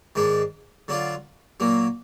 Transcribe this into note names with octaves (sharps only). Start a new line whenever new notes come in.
G#2 D#3 G#3 D4
D3 F#3 D4 F4
A#2 F#3 A#3